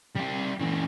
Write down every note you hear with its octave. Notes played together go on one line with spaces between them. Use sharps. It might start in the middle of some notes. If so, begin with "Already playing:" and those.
G3 E5
A#2 E3